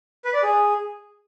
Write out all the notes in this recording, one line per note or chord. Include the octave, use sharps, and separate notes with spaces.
B4
D5
G#4